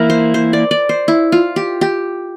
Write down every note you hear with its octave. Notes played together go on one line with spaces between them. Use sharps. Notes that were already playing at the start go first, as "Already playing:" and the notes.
Already playing: E3 A#3 E4 A#4
C5
C5
D5
D5
C5
E4
F4
G4
G4